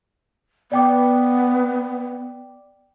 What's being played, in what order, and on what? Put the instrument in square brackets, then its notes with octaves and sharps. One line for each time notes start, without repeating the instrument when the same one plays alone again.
[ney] B3 [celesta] D5 G5 D6